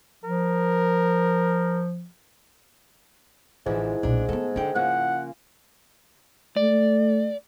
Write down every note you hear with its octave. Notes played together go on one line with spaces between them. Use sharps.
F3 A#4
A1 G#2 D3 E3 F3
B1 A#2 D4
A3 B3 A4
D3 E4 G5
C#3 F3 A#3 F#5
A3 D5